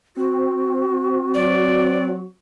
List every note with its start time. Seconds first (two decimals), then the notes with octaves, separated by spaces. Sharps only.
0.17 C4 F#4
1.34 F#3 D5